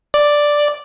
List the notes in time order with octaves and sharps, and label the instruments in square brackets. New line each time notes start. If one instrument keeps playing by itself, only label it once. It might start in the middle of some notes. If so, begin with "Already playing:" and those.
[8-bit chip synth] D5